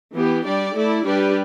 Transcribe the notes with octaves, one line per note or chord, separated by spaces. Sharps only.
E3 B3 G4
G3 D4 G4 D5
A3 E4 A4 D5
G3 D4 G4 B4 D5